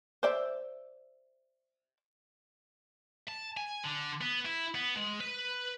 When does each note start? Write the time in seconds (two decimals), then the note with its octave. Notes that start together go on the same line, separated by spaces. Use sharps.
0.23 C5 D5 E5
3.28 A5
3.57 G#5
3.84 D3
4.21 B3
4.45 E4
4.75 B3
4.96 G#3
5.20 B4